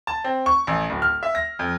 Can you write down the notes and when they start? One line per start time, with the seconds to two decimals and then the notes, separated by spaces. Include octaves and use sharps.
0.07 A5
0.24 C4
0.46 C#6
0.67 A1
0.90 D1
1.02 F6
1.23 E5
1.35 A#6
1.59 F2